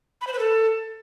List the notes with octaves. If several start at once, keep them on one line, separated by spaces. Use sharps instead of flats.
B5
C5
B4
A4